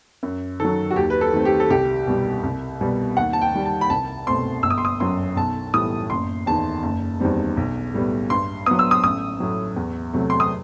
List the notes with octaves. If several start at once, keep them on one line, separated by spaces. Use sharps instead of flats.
F#2
D#3 F#3 A4
F#4
D#2 G4
B4
A4
D#3 A3 C4
G4
A4
C2 G4
B2 G3
C2
B2 G3 B3
D#2 F#5
A5
G5
D#3 G3
A5
B5
C2 A5
B2 A3 C4 C6
G1 E6
D#6
C6
D#6
F#2 F#3 C6
B1 A5
A2 E3 G3 D#6
F#1 C6
E2 D#3 A5
F#1
E2 D#3 G3 C4
B1
A2 G3 B3
G2 C6
F#3 B3 D#6
E6
D#6
A1 D#6
A2 F#3
E2
C3 F#3 A3
C6
D#6